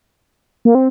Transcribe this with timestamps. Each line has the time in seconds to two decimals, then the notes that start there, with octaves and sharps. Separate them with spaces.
0.65 A#3
0.75 C4